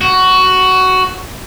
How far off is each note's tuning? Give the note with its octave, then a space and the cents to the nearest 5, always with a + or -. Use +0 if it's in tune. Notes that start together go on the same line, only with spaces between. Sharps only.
F#4 +10